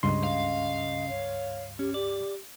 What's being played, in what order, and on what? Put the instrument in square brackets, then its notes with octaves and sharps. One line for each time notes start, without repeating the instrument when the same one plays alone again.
[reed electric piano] C#2 G2 C6 [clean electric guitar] C#3 [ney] D#5
[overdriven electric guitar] F5
[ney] C#5
[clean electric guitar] C#4 [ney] G4
[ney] G4 [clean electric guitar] D5